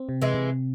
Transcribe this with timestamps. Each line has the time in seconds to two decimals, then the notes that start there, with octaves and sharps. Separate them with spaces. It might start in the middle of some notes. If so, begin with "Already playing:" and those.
Already playing: C4
0.09 C3
0.22 E3 G#3
0.34 C3